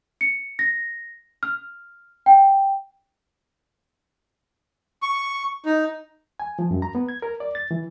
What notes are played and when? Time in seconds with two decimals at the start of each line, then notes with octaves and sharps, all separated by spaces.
0.21 C#7
0.59 A#6
1.43 F6
2.26 G5
5.02 C#6
5.66 D#4
6.40 G#5
6.59 F3
6.71 F#2
6.82 A#5
6.95 B3
7.09 G#6
7.22 A#4
7.40 D5
7.55 A6
7.71 E3